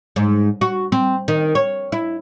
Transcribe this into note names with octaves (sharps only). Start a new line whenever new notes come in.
G#2
F#4
C4
D#3
C#5
E4